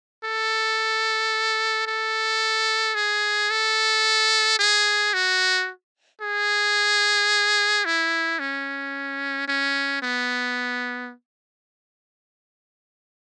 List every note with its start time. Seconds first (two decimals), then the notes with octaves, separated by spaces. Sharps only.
0.24 A4
1.87 A4
2.95 G#4
3.50 A4
4.59 G#4
5.14 F#4
6.21 G#4
7.85 E4
8.39 C#4
9.48 C#4
10.02 B3